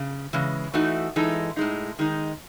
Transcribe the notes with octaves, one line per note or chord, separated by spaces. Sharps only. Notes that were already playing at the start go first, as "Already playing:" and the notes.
Already playing: C#3
C#3 E3 G#3
E3 A3 D#4 F#4
E3 G#3 D#4 A4
A2 G#3 D#4
D#3 G#3 D#4